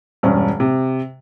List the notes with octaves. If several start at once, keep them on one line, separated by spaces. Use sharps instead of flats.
E1 G2 C#4
C3